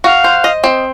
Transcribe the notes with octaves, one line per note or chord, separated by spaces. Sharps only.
F#4 F5
C5
D#5
C4